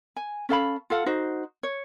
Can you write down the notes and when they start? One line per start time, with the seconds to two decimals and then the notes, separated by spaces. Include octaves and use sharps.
0.16 G#5
0.49 C#4 A4 F5 B5
0.90 F4 A4 F5 F#5
1.06 D#4 F#4 C5
1.63 C#5